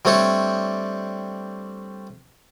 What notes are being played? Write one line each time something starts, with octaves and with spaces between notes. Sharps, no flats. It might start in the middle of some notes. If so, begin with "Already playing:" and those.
G3 A3 C4 D4 C#5